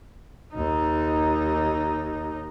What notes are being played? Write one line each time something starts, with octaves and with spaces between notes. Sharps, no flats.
D#2 D#4